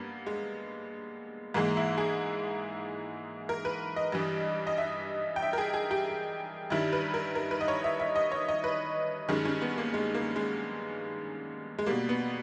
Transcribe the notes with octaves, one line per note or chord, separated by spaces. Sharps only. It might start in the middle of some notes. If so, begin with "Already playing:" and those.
Already playing: G2 A#3 B3
G#3
G#2 E3 G#3 A#3
E4
G#4
A#4
B4
D#5
G2 E3 G3
D#5
E5
G5
E5
A#4
G#4
G#4
G4
G2 D#3 G3 E4
B4
A#4
A#4
B4
D#5
C#5
E5
E5
D#5
C#5
D#5
B4
G2 D#3 G#3 C#4
C#4
B3
A#3
G#3
A#3
G#3
G#3
B2 G3 A#3
B3